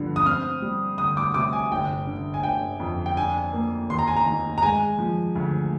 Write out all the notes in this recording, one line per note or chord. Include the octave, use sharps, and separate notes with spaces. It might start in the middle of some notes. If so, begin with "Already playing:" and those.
Already playing: G2 D3 F3
D#6
C4 F6
G3
D2 D#6
D6
C3 D6
G#5
G1 G5
D3
G#5
G1 G5
F2
G5
D4 G#5
A#3
D#2 C6
A#5
G#5
A#5
D#3
A#5
G#3 G#5
F3
D2